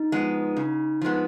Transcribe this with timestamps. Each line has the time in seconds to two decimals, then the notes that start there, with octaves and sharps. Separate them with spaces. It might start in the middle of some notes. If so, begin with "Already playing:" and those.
Already playing: D#4
0.12 F3 G#3 B3
0.57 C#3
1.02 F3 G#3 B3